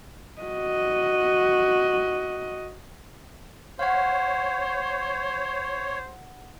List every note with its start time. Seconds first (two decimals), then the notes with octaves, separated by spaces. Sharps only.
0.42 F#4 D#5
3.79 C5 C#5 F5 F#5